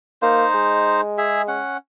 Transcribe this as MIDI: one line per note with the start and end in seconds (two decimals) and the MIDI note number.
0.22 0.45 58
0.22 1.01 63
0.22 1.01 72
0.54 1.60 56
1.18 1.42 68
1.18 1.42 76
1.48 1.77 61
1.48 1.77 78